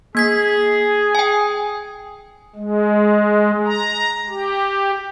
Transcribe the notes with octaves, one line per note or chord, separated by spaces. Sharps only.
A#3 G#4 G#6 B6
G5 G#5
G#3
A#5
G4